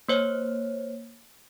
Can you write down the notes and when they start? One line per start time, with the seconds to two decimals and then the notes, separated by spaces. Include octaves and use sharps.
0.08 A#3 C5 C#5